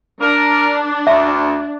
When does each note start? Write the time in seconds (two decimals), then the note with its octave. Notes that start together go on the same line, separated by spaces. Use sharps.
0.21 D4 A#4
1.07 D2 E5